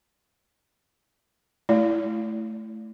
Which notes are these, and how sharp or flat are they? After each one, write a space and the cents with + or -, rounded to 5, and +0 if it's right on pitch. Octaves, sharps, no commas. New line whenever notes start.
A3 -10 E4 +5 D5 -25